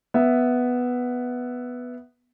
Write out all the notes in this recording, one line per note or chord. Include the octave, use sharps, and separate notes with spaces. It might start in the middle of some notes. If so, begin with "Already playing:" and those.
B3 E5